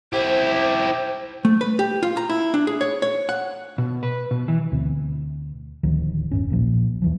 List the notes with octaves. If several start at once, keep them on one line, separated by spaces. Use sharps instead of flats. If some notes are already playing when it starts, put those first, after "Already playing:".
E4 G4 C5
A3
B4
G4
F4
A#5
E4
D4
G#4
C#5
C#5
F#5
B2
B4
B2
E3
D2 B2 C4
D1 D2 D#3 F3
E1 G#2 C#4
D1 A#1 A#2 F3
D#2 E3 F3